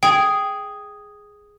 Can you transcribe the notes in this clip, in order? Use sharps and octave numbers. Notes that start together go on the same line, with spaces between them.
G#4 G5